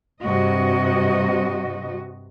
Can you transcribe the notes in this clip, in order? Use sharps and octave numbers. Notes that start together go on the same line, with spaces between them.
G2 C3 F#4 D#5